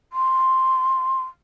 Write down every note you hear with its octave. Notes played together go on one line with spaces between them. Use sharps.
C6